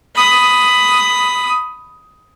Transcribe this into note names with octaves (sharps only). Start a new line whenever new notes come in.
B5 D#6